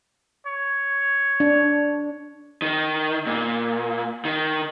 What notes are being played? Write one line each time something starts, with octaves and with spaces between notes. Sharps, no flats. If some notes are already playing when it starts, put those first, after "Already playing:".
C#5
D4
D#3
A#2
D#3